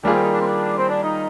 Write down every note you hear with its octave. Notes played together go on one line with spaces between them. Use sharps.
D#3 G3 A#3 D4 F4 G#4
C4
D#4
D4
C4
D4
C4
D4
D#4